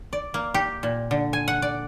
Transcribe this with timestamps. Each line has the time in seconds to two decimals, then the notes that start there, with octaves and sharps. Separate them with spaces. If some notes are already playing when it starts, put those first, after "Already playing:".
0.13 D5
0.34 A#3
0.54 G4
0.83 A#2
1.11 D3
1.33 G#5
1.48 F#5
1.62 D5